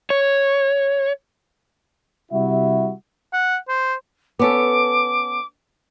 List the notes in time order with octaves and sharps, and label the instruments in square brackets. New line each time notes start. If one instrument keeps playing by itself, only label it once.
[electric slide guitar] C#5
[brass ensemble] C3 G3 E4 F#4 E5
[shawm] F#5
C5
[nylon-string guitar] B3 C#4 A4 [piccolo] D6